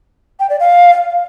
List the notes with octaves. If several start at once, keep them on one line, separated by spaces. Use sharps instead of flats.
G5
D5
F5